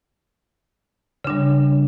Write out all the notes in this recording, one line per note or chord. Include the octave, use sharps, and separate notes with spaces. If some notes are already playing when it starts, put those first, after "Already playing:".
C#3 G3 D4